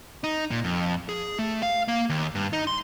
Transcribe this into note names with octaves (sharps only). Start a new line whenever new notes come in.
D#4
A#2
F2
G#4
A3
F5
A#3
D#2
G2
D#4
C6